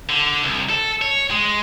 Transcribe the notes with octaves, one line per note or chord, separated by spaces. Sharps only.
D3
C2
A4
C#5
G#3